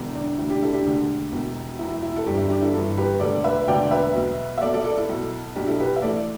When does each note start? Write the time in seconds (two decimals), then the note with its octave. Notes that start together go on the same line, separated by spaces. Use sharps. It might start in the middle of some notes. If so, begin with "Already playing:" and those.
Already playing: E1 E2 D3
0.15 D4
0.27 D4
0.38 E1 D2 D3 E4
0.50 D4 G4
0.62 E4 A4
0.73 D4 G4
0.85 E1 D2 D3
1.32 E1 E2 B2
1.79 E1 E2 B2 E4
2.03 E4
2.16 A4
2.26 G1 G2 E3 D4 G4
2.38 E4
2.50 D4 G4
2.62 E4 A4
2.73 G1 G2 E3 E4 A4
2.98 G4 B4
3.20 E1 D2 D3 A4 D5
3.44 B4 E5
3.67 E1 D2 D3 D5 G5
3.91 B4 E5
4.15 B1 B2
4.58 E5
4.61 B1 B2 A4 D5
4.73 A4 D5
4.85 A4 D5
4.98 E4 A4
5.09 B1 B2
5.55 B1 B2 D4 G4
5.67 E4 A4
5.80 G4 B4
5.96 E5
6.02 A1 A2 E3 A4 D5